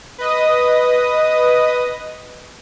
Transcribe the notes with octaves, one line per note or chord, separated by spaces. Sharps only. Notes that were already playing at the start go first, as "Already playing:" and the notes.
B4 D#5 D#6